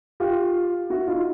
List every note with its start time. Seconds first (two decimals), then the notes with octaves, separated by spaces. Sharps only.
0.20 F4 G4
0.90 E4 F#4
1.08 D#4 F4